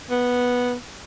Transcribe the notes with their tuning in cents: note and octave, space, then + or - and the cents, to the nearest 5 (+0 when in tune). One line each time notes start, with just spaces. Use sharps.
B3 -5